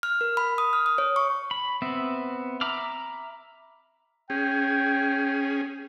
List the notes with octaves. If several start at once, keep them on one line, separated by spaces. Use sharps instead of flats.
F6
A#4
B5
D#6
F6
D#6
C#5
C#6
B5
B3 C4 E5
E5 A#5 B5 D6 F6
C#4 G#4 G5